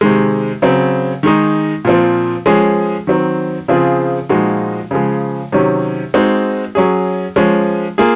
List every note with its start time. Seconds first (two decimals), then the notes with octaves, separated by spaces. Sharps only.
0.01 C3 D#3 G#3
0.62 C#3 F#3 C4
1.23 D#3 G#3 D#4
1.85 A#2 F3 C4
2.46 F3 G#3 C#4 G#4
3.07 D#3 F#3 C4
3.68 C#3 F3 C4 F4 G#4
4.29 A#2 F3 G#3 D#4 F#4
4.91 C#3 F3 G#3
5.52 C3 D#3 F#3 C#4
6.14 G#3 C4 D#4 F#4
6.75 F#3 C#4 G#4
7.36 F3 G#3 C#4
7.98 A#3 F4 G#4